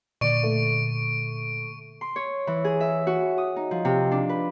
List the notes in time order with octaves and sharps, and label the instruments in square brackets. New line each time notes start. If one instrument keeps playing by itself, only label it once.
[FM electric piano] A#2 D3 [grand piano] D5 [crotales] C#6 D7
[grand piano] A3
[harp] C6
C#5
E3
G#4
E5
F#4
D#6
D#4
F3
C3
D4
B4